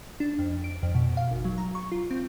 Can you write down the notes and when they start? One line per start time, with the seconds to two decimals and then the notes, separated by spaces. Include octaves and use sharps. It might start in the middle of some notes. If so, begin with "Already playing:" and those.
0.20 D4
0.39 F2
0.64 D7
0.83 F2
0.95 B2
1.17 F5
1.31 G#1
1.45 F#3
1.58 A#5
1.75 C#6
1.91 F4
2.11 C4